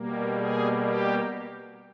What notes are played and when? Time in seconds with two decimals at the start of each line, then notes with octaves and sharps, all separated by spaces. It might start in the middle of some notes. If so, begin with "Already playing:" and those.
Already playing: B2 G3 A#3
0.35 G#4
0.82 G4